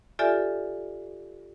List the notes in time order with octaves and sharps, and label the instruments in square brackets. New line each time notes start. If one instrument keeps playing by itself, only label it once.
[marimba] F4 G4 A4 D5 E5 G#5